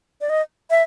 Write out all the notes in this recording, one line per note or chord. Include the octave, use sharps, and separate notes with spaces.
D5
D#5
E5